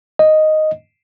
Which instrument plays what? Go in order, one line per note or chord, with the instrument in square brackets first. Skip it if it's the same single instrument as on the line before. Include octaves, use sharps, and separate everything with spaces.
[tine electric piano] D#5